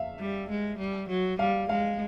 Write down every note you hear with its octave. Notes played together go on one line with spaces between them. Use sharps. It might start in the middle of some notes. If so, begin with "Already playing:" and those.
Already playing: E5 F5
G3
G#3
G3
F#3
G3 F5
G#3 F5